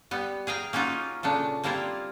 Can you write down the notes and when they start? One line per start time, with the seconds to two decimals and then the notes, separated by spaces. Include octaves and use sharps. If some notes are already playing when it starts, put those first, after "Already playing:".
0.11 G3 B3
0.47 G#4 F5 G5 A#5
0.73 A#3 C#4 D#4 F4 F#4
1.23 A#2 C#3 A3 D4
1.64 G3 A#3 C4 E4 F4